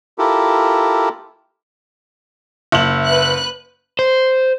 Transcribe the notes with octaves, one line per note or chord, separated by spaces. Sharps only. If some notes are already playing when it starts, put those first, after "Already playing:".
E4 F4 G4 A4 A#4
F#1 E5 F#7
B4 F#6
C5